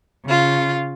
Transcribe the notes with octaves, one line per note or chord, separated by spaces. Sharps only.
C#3 F4